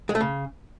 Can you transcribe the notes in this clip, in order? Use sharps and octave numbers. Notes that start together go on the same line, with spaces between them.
G#3
A3
C#3